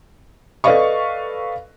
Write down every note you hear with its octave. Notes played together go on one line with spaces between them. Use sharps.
A4 B4 D5 D#5 F5 C#6